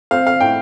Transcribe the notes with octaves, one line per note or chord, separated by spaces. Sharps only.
C4 F5
F5
A2 G5